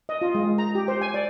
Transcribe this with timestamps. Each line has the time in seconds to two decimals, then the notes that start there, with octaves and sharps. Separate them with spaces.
0.09 D#5
0.21 F4
0.35 G#3
0.58 A#5
0.75 G4
0.88 C5
1.02 G#5
1.14 D5